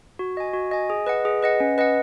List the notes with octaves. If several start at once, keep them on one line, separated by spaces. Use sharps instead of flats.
F#4
D#5 G#5
F#4
D#5 G#5
G#4
B4 D#5 F#5
G#4
B4 D#5 F#5
C#4
B4 D#5 F#5